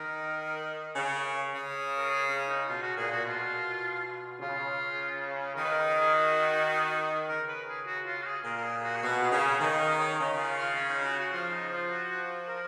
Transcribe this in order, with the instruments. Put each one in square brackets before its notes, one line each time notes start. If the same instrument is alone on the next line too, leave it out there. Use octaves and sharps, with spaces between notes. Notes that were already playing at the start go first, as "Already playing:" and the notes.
Already playing: [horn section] D#3 [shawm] A#4
[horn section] C#3
C#3
[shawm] A#4
G#4
C#4
D#4
[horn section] B2 [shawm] F4
[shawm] F#4
[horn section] A#2 [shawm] G#4
[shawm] F#4
[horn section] B2 [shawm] F4
[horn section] C#3 [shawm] F4
[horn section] D#3 [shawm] A#4
[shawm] B4
A#4
A#4
G#4
F#4
[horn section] C#3 [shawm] A#4
[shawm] B4
G#4
F#4
F4
F#4
G#4
[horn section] A#2 [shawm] A#4
[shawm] A#4
G#4
F#4
G#4
[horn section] B2 [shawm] F#4
[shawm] G#4
[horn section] C#3
[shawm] G#4
[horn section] D#3 [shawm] D#5
[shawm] D#5
C#5
[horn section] C#3 [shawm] D#5
[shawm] F4
F4
C#4
D#4
F#4
F#4
[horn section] F3 [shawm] F4
[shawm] D#4
F4
F#4
F#4
A#4